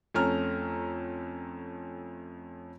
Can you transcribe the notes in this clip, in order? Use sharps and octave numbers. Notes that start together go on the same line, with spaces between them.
F2 A3 C#4 A#5 F6